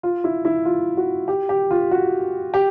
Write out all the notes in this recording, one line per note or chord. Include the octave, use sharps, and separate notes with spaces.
F4
E4
E4
F4
F#4
G4
G4
F4
F#4
G4